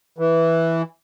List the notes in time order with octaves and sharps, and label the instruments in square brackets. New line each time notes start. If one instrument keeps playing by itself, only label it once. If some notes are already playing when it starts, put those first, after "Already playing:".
[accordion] E3